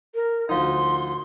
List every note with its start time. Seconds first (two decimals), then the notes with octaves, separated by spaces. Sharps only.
0.15 A#4
0.49 D2 F3 D#4 C6